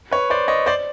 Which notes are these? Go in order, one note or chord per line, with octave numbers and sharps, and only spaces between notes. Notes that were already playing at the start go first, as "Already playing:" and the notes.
B4 C#5
C5 D5
C#5 D#5
C5 D5